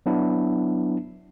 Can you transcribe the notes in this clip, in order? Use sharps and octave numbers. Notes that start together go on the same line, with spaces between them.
F#3 B3 D4 E4